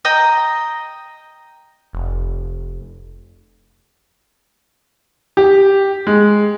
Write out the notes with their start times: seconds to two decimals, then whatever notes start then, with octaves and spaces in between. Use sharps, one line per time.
0.05 D#5 G5 A#5
1.93 F1
5.37 G4
6.07 G#3